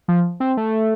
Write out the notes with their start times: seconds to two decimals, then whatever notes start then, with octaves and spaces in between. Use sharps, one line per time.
0.08 F3
0.40 C4
0.57 A3